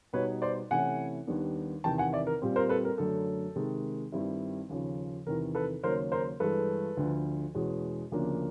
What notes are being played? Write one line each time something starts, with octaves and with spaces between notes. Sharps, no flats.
B2 G3 B3 D#4 B4 C#5
C5 D5
C3 E3 A3 C#4 E4 F#5 G#5
D#2 D#3 G3 B3 D4
E2 C3 D#3 G5 A5
F#5 G#5
D5 E5
A#4
A#2 G3 C4
A#4 C5
A4 B4
A#4
F#2 D3 F#3 A3 A4
C3 D#3 G#3
G2 D#3 G3 C4 E4
D#2 C#3 F3
E2 C3 D#3 A#4
A4 B4
D#2 C#3 F#3 A#3 C#4 A#4 C5
A#4 C5
G2 E3 G#3 A4 B4
D2 D3 F3
E2 B2 G#3 C#4
D2 C#3 F3 A#3 D4